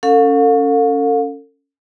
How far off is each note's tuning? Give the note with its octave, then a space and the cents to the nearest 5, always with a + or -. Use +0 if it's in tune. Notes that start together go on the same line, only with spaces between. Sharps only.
C#4 +0 A4 +35 F5 +40